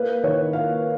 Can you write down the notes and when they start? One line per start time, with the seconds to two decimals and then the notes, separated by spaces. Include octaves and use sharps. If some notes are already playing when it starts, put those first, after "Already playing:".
Already playing: A#3 B4
0.23 D#3 C#5
0.53 A#3 F5